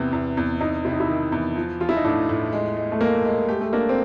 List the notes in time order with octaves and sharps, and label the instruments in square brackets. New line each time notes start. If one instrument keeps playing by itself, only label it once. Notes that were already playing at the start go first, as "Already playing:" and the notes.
Already playing: [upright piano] E2 C3 [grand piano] B3
[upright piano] E2
E2
[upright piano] E2 [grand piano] D#4
[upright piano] C3 [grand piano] E4
[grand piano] D#4
E4
[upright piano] D#3
E2
F3
[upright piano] F3 [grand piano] F4
[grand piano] E4
D#4
[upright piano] A2 [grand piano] D4
[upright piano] A2
G#3
G#3
[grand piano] A3
[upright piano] G#3 [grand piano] A#3
[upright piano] G#3
[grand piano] A3 [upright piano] G4
[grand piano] A3
[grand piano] A#3 [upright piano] D4
[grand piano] C4